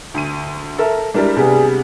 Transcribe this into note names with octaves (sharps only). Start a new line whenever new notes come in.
D2 D#7
A4 A#4 E5
G3 G#3 D4 E4 A#4
C3 B3 G#4